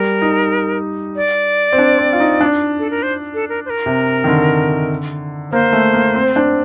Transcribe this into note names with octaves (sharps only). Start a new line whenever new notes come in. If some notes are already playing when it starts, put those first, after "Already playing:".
Already playing: G3 A#4
D#4
D5
C4
D4
C4
F4
D#4
D4
A4
A#4
C5
A4
A#4
C5
A#4
C3
D#3
D3
A#3 C5
A3
A#3
C4
D4